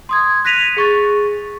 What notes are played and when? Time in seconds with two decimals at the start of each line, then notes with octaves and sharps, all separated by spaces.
0.09 C6 D#6 G#6
0.45 F#6 A#6 B6 D#7 F7
0.77 G#4 C#6 A6